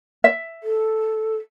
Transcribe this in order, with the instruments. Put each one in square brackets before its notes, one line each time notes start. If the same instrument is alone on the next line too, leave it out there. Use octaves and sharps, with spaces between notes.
[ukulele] E5
[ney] A4